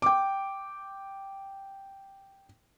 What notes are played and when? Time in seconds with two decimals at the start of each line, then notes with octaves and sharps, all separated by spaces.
0.02 G5 D6